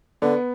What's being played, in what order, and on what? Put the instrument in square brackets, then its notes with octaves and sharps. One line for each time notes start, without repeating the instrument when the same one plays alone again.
[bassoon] D3 [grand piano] B3